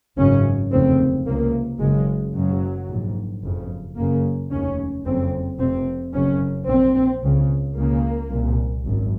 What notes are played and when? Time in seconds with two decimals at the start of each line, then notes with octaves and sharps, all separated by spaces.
0.18 G#1 F#2 C#3 C#4
0.71 F1 D#2 C#3 C4
1.26 C#2 C3 A#3
1.80 F#1 F#2 C#3 G#3
2.34 F#1 F#2 C#3 F#3
2.89 A#1 G#2
3.43 F#1 F2 C#3
3.97 F#1 F#2 C#3 A#3
4.51 F1 D#2 C#3 C#4
5.05 F#1 F2 C#3 C4
5.59 F1 F2 C3 C4
6.14 F#1 F#2 C#3 C#4
6.68 A#1 A#2 C4
7.22 C#2 C#3
7.76 C#2 C#3 A#3
8.30 C2 A#2
8.85 G#1 F#2